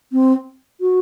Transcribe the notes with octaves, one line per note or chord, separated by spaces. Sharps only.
C4
F#4